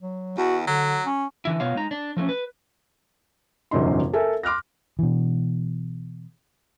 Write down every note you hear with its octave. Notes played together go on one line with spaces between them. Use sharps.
F#3
E2 F#4
D3 F#3
C#4
D3 E3 E4
B2 B3 F4 C#5 F5
G#3 D#4 A#5
D4
F3 A3 C4 C#4
B4
E1 A#1 F#2 C#3 D#4 C6
A4 A#4 E5 G#5
C6 D6 F6 F#6 A#6
B2 E3